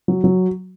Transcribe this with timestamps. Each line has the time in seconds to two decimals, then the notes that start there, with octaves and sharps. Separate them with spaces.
0.08 F#3
0.24 F#3